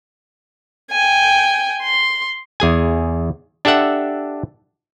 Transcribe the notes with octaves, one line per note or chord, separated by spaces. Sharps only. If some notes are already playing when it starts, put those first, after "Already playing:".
G5 G#5
C6
E2 G#4 G#5
D4 G4 A4 E5 F#5